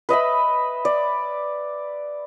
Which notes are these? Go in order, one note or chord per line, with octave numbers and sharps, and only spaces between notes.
B4 D#5 E5 B5
D5